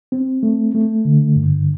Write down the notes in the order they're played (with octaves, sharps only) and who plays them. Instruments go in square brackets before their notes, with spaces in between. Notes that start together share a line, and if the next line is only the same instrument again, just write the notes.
[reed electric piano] C4
A3
A3
D3
G2